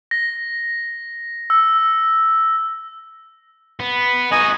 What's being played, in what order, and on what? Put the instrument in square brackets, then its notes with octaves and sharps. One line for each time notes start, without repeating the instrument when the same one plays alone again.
[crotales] A#6
E6
[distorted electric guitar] B3
[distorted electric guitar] D#4 F#4 [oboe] D#5 [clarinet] G#5